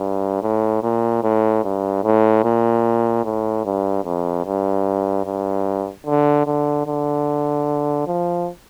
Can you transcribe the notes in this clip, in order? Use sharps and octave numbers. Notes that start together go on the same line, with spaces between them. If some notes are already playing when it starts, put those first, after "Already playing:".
Already playing: G2
A2
A#2
A2
G2
A2
A#2
A2
G2
F2
G2
G2
D3
D3
D3
F3